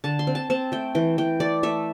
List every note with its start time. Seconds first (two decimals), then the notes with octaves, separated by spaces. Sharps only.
0.04 D3 A5
0.19 C6
0.27 C4
0.35 A5
0.50 C4 A5
0.72 A3 G5
0.95 E3 G5
1.18 E3 G5
1.40 A3 D5
1.63 A3 E5